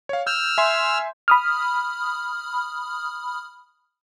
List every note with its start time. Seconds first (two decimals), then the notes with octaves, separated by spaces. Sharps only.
0.09 C#5 F5
0.27 E6 F6 G6
0.58 E5 G#5 C6
1.28 B5 D#6 F6